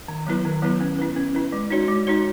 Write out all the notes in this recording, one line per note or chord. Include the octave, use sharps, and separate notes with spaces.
D#3
F#3 B3 E4 B4
D#3
F#3 B3 E4 B4
C#4
E4 B4
C#4
E4 B4
G#3
D#4 F#4 C#5
G#3
D#4 F#4 C#5